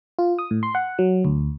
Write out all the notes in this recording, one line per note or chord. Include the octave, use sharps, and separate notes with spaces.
F4
D#6
A2
C6
F#5
F#3
D2